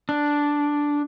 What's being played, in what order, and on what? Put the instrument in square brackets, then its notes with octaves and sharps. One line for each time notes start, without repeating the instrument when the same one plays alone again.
[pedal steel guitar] D4